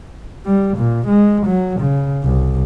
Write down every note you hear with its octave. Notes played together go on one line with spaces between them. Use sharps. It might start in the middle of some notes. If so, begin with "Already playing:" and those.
G3
A#2
G#3
F#3
C#3
C2